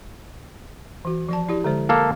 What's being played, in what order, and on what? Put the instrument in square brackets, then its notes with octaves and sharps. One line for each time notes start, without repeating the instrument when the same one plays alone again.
[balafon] E3 F#4
F3 D5 A5
E4 G4 D5
D3 G#3 C5
[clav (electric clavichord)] A#3 A4 F5